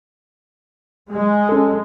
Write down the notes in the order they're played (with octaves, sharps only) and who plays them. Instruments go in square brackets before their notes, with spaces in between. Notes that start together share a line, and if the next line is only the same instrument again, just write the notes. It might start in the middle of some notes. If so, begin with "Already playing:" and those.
[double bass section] G#3
[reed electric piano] C#4 A4